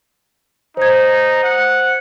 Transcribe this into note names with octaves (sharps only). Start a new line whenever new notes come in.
D#4 C5 G#6
F#5